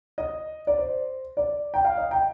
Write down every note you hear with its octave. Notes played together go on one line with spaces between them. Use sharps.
D#5
D5
C5
D5
G5
F5
D#5
G5